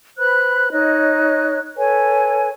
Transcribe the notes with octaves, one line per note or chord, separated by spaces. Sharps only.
B4 C5 B5 F#6
D#4 C#5 D#5 F#6
A4 B4 C#5 G#5